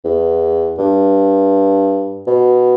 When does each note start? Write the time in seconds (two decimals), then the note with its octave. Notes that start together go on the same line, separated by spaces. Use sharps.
0.04 E2
0.78 G2
2.27 B2